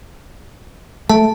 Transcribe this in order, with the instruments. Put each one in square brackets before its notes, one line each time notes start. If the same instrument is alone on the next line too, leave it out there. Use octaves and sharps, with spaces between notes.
[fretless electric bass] A3 [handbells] A5